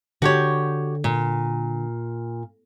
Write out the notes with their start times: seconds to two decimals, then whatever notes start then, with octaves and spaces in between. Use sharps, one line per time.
0.22 D3 F#4 G4 C#5
1.04 A#2